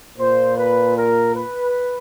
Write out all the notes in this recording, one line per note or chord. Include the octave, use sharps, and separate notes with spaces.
A#2 C5
B4
A#4
B4